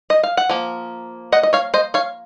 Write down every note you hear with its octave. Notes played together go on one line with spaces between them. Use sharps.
D#5
F5
F#5
F3 A#3
D#5 F#5
D#5
C#5 F5
C5 D#5
C#5 F5